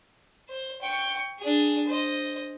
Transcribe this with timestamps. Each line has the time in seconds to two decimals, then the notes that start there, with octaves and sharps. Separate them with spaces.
0.49 C5
0.82 G5 C#6
1.40 D4 G#4
1.87 C5 D#5